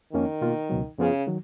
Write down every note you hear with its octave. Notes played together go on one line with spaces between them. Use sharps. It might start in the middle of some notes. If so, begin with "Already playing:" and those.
F2 D#3 F3 A#3 C#4
B2 A#3 F4
C#2 B2 F#3
F#2 C#3 F3 B3 F4 G#4
D#3 F#3